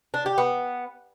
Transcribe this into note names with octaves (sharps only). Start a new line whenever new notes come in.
D4
G4
B3